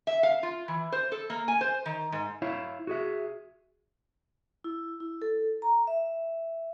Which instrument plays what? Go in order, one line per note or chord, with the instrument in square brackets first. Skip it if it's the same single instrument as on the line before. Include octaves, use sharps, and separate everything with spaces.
[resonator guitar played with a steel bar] E5
F5
F4
E3
C5
A4
A#3
G#5
C5
D#3
G#2
[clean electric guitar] E4 C#5 E5 F5
F#4 G#4 E5
[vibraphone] E4
E4
A4
A#5
E5